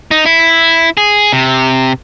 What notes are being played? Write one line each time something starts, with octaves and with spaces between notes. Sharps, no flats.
D#4
E4
G#4
C3